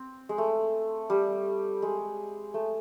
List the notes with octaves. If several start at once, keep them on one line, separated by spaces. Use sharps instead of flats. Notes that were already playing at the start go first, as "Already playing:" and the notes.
Already playing: C4
G#3
A3
G3
G#3
A3